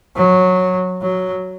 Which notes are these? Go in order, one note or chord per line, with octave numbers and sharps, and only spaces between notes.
F#3
F#3